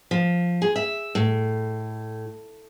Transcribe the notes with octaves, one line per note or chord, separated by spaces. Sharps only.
F3
G#4
E5
A2